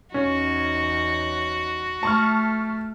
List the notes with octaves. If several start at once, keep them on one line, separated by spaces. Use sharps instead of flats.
E2 C#4 D#4 F#4
A3 A5 C#6 F6